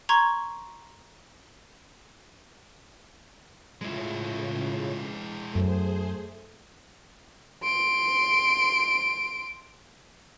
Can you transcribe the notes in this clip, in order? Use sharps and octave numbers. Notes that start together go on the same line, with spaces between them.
A#5 C6 C#6 G#6
A2 C#3 G#3 E4 F4
F#2 A3 G#4 C5
C6 D7